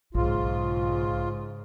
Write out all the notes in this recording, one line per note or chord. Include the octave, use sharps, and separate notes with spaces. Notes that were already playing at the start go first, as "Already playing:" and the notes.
B1 G#2 C#3 F4